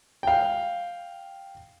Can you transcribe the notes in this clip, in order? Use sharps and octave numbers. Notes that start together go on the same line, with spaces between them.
F5 G5